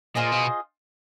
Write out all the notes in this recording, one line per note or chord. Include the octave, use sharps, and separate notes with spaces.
A#2 F4 G#4 C5 D#5
B2